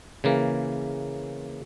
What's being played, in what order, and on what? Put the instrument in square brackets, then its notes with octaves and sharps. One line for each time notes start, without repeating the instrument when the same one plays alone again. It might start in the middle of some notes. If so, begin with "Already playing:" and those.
[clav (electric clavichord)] C#3 E3 A#3